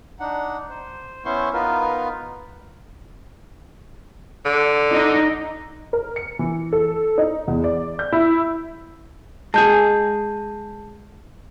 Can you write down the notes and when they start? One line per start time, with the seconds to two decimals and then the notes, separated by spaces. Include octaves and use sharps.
0.20 D4 D#4 F#5
0.70 C5
1.25 B3 C#4 E4 C5 C6 C#6
1.53 B3 D#4 F4 A#4 B4
4.45 D3
4.91 D#4
5.93 A#4
6.16 C#7
6.39 E3
6.72 A4
7.18 D#4
7.48 E2
7.64 D5
7.99 G6
8.12 E4
9.54 G#3 G#4 A5 G6